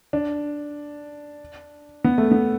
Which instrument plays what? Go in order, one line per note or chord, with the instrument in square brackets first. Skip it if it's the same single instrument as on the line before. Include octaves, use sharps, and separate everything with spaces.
[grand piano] D4
B3
A3
B3